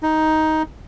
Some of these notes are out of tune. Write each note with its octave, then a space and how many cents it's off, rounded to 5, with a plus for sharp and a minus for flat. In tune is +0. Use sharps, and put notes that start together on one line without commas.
D#4 +10